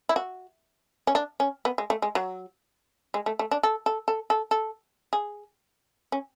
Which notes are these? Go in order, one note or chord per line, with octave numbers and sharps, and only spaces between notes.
E4
F#4
C#4
D4
C#4
B3
G#3
A3
G#3
F#3
G#3
A3
A3
D4
A4
A4
A4
A4
A4
G#4
C#4